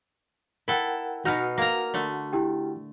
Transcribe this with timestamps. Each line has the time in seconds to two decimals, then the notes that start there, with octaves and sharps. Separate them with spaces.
0.68 E4 A4 A#4 F#5 G5
1.25 B2 D#4 F#4 F#5 F6
1.58 A#3 A#5
1.94 D3 A3
2.33 E4 G4 G5